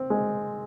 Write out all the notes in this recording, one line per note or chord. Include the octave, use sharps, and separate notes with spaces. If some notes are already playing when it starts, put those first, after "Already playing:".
Already playing: C4
G#3